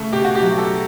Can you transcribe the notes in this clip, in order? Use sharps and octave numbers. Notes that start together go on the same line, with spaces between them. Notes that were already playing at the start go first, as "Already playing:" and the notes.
Already playing: C#3 A3
B2 G4
F#4
G4
F#3
A4